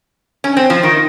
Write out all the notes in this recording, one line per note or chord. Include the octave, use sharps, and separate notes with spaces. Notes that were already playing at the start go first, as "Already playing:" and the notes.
C#4
C4
F3
D#3